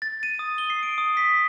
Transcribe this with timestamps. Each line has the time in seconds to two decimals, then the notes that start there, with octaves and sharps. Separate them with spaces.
0.02 A6
0.23 D#7
0.39 D#6
0.58 G7
0.70 C7
0.83 D7
0.98 D#6
1.17 B6